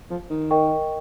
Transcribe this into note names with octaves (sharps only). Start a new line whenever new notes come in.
F3
D#3
A#4 D#5 G5 C#6